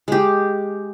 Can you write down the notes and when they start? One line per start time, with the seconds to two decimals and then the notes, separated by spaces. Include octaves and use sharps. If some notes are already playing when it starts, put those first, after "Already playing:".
0.08 G#3 G4